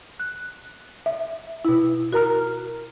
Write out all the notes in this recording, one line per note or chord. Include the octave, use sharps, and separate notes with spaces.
F#6
E5
B2 E4
F#4 A#4 A#5 F6